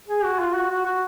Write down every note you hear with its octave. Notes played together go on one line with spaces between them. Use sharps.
G#4
F#4
F4
F#4
F#4
F#4